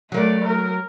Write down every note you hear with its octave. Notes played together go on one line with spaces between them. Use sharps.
F#3 A3 A#3 D5
A#4